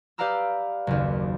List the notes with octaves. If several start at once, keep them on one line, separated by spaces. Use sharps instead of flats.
G4 B4 D5 F5 A#5 E6
F#1 D#2